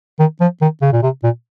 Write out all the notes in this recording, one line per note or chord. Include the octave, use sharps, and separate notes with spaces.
D#3
F3
D#3
C#3
A#2
C3
A#2